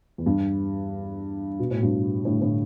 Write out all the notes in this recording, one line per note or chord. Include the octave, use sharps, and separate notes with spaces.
E2
G2
B2
A2
G2 B2
A2 D3
A2 D3